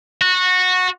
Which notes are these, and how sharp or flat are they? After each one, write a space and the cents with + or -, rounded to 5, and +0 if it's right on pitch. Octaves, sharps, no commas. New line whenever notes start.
F#4 -15